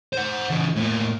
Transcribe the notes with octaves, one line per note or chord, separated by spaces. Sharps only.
C5 F#5
C#3 E3
A2 A#3